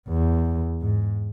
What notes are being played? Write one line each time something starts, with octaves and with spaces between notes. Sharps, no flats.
E2
G#2